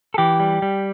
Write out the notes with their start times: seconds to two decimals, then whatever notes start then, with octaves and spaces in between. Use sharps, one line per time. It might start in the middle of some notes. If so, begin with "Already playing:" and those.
0.14 A4
0.18 E3 G4
0.40 G3
0.62 G3